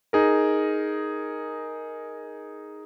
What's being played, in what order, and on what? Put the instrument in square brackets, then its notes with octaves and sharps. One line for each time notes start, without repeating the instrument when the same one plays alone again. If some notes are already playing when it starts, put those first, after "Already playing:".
[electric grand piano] D#4 G#4 A#4